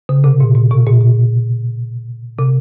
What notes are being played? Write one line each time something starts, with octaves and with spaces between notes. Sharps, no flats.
C#3
C3
A#2
A#2
B2
A#2
B2
C3